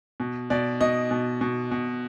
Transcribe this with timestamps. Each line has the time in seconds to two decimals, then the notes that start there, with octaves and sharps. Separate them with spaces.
0.20 B2
0.50 B2 D5
0.81 B2 D#5
1.11 B2
1.41 B2
1.71 B2